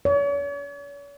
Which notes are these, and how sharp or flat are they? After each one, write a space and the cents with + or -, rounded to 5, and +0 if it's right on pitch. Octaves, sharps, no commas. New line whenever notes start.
C#5 +40